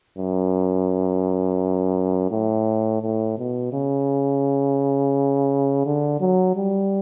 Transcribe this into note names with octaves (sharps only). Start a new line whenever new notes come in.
F#2
A2
A2
B2
C#3
D3
F#3
G3